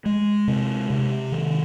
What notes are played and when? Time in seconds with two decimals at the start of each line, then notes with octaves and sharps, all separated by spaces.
0.06 G#3
0.48 C3
0.90 C3
1.32 D#3